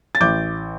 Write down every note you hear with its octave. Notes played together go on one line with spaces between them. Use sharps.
A6
A1 D6 G6